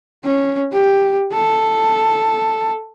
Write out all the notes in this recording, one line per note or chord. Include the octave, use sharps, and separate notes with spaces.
C#4
G4
A4